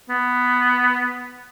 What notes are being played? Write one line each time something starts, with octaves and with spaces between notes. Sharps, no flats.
B3